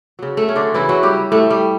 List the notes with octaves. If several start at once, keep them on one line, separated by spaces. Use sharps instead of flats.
C#3 F#3
A3
C#4
D3 D4
C#3 E3 F#3 E4
F#3 F#4
G3 G4
A2 G3 A3
G3